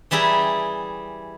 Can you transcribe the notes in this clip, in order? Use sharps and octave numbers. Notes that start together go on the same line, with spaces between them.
E3 G3 E4 G#4 A#5